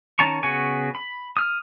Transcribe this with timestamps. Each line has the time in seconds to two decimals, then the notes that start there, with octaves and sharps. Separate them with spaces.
0.19 D#3 C#4 A5 A#5 C#6
0.43 C#3 B3 F#4 G#5 C#6
0.95 B5
1.37 D#6 F6